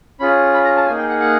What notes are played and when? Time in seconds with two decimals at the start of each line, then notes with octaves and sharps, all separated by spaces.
0.20 C#4 F4 G#4 B5
0.54 B5
0.64 A#5
0.76 A5
0.87 A#3 D#4 G#4 G#5
0.98 G5
1.09 F#5
1.20 F#5